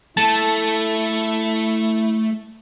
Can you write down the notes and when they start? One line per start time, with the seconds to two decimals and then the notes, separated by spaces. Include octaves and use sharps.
0.17 A3 E4 A5